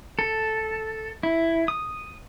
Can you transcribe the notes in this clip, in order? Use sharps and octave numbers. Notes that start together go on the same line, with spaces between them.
A4
E4
D#6